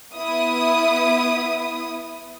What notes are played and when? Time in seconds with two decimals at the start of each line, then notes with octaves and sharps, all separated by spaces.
0.17 B3 E4 D#6